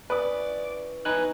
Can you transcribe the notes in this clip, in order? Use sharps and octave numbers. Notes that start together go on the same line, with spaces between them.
E3 C#4 B4 D5 F#5 D#6
F#3 B3 D#4 B4 G#5 F#6